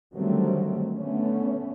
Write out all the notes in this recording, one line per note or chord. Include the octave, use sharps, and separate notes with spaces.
D3 D#3 F#3 G3 A3 C4
D3 A3 B3 C#4